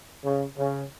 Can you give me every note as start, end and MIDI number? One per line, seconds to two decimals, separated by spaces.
0.23 0.44 49
0.57 0.83 49